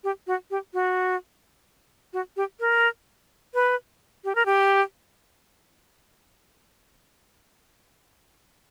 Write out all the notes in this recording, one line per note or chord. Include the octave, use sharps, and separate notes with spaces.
G4
F#4
G4
F#4
F#4
G4
A#4
B4
G4
A#4
G4